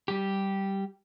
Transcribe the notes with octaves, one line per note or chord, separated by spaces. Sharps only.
G3 G4